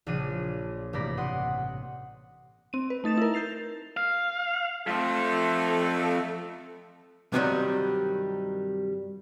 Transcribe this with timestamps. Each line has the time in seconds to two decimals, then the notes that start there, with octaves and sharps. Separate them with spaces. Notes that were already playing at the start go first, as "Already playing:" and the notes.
0.07 A#1 C#3 F3 D4 D#7
0.93 A1 G2 C3 D5 B5 A#6
1.17 F#5 C6 D#6 F#6
2.73 C4 D#7
2.90 B4
3.04 A3 D#4 A6 E7
3.17 E4 A#4
3.34 G6 A6 C7 F7
3.97 F5
4.87 F3 A3 C4 A4
7.32 G2 C3 D#3 E3 F#3 G3